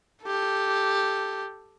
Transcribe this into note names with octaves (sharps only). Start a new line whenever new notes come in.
G4 A4